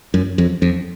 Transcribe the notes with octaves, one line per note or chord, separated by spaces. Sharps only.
F#2
F2
F2